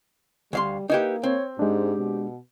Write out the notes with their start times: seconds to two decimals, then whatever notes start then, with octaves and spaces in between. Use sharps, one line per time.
0.53 D2 G3 F5 C6
0.90 A#3 D#4 E4 G4 B4
1.23 C4 C#5
1.59 G#2 G#3 D4 G4
1.99 B2